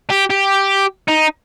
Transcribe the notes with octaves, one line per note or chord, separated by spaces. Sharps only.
G4
G4
D#4